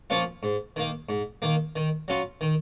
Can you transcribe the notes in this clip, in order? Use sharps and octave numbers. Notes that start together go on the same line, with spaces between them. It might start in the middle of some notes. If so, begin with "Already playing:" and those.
F3 A#3 C#4 F4
G#2
D#3 A#3
G#2
D#3 A#3
D#3
F#3 C#4 F4
D#3